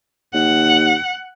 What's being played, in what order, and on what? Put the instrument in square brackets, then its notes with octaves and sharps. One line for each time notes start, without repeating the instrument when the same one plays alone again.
[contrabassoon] D#2 [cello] F#5